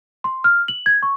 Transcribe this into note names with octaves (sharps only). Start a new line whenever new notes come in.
C6
F6
F#7
G#6
C#6